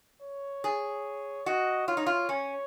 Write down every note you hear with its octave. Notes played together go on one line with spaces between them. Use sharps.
C#5
G#4
F#4 D#5
F4 C#5
D#4
F4
C#4